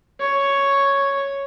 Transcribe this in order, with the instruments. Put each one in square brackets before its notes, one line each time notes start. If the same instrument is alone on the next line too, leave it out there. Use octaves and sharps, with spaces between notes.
[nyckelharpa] C#5